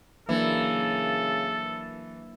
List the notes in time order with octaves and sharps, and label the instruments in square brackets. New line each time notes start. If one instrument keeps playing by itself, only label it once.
[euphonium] C#3 [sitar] E3 [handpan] F#3 A#3 D4 [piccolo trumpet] A4